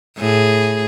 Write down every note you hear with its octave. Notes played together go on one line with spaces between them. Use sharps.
A2 G#4